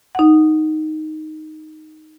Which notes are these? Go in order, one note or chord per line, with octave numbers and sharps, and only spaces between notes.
D#4 F#5